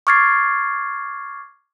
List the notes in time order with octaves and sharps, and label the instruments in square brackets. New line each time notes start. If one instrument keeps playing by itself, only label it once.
[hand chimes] C#6 D6 F6 G#6 A6 C7